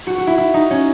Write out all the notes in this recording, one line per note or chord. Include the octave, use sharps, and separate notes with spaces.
F#4
F#4
E4
E4
D#4
C#4